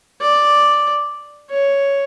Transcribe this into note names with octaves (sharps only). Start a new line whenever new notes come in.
D5
C#5